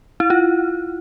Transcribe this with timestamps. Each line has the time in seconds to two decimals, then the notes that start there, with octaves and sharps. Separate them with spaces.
0.20 E4
0.30 F4